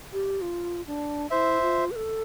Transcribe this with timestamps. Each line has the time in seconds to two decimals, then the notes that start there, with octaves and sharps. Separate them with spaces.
0.13 G4
0.41 F4
0.87 D4
1.31 E4 C5 E5
1.61 F4
1.91 B4
1.96 A4